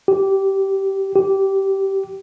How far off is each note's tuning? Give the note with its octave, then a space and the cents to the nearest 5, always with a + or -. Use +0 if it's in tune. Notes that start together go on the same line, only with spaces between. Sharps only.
G4 -15
G4 -15